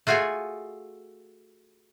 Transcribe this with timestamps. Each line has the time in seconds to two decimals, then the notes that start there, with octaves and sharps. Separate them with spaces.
0.07 A3 F4 F#4 G#4 G#5